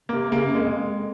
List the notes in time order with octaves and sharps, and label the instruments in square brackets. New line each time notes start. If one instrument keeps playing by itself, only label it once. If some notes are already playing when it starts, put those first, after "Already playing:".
[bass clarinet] C3 [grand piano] A#3
[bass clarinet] C#3 [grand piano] A#3
[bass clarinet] F#2
[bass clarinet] F2 [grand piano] G#3